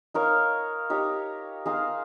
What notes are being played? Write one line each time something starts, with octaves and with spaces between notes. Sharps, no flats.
D#4 A#4 C#5 F5
D#4 G4 C#5
D#4 G#4 C5 F5